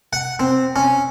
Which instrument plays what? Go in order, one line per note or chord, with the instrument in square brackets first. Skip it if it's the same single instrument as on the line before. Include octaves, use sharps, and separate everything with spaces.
[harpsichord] F#5
C4
C#4